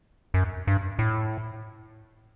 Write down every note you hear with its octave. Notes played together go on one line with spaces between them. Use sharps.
F#2
G2
A2